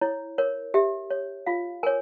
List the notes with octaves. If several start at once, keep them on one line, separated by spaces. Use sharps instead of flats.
E4 C#5
A#4 C#5
G4 E5
C#5
F4 F5
A#4 C#5 G#5